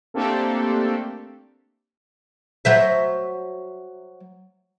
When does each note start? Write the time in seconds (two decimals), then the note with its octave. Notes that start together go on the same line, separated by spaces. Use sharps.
0.14 A3 A#3 C4 D4 G4 A4
2.65 F#3 C5 E5